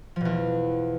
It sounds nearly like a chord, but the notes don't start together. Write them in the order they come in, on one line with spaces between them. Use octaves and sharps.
F3 B2 E2